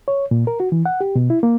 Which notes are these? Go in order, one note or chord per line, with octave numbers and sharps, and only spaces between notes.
C#5
A#2
A#4
F#4
E3
F#5
G4
B2
E4
A#3